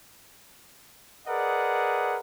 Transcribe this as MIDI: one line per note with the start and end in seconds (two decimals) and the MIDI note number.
1.27 2.19 68
1.27 2.19 70
1.27 2.19 71
1.27 2.19 74
1.27 2.19 75
1.27 2.19 78